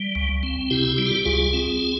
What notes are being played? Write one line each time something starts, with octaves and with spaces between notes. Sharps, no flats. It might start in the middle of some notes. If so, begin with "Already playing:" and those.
Already playing: G3
C#2
C4
C3 E4 G4
G3 E4
F4
G4
C#2 F4 G#4
C4